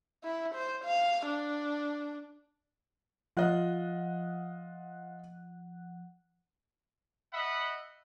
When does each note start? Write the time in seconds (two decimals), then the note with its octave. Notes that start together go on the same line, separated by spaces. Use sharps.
0.24 E4
0.55 C5
0.85 F5
1.26 D4
3.37 F3 F4 D#5 F#5 F#6
7.33 D#5 E5 F#5 B5